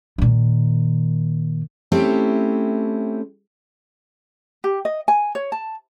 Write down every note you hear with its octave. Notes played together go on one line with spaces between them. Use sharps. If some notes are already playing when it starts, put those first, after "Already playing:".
A#2 D#3
A3 C4 C#4 E4 G4
G4
D#5
G#5
C#5
A5